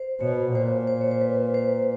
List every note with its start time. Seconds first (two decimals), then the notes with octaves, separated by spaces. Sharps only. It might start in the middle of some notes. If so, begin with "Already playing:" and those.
Already playing: C5
0.21 B2 C#5
0.54 A#2 C5
0.87 C5
1.01 C#5
1.11 C5
1.21 B4
1.54 C5